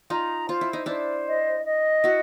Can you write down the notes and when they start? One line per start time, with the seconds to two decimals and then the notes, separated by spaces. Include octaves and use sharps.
0.10 D#4 F4 A#5
0.48 F4 C5
0.61 E4
0.73 D#4
0.86 D4 E4 C5
1.27 D#5
1.65 D#5
2.04 E4 F#4 F#5